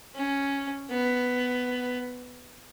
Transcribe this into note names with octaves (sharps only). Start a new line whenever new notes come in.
C#4
B3